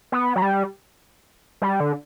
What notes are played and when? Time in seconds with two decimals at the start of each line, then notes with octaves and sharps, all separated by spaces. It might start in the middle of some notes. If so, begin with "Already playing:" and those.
0.12 B3
0.36 F#3
0.42 G3
1.62 G3
1.80 D3